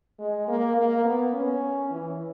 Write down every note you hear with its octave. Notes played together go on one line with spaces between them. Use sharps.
G#3
A#3
A#3
B3
C#4
E3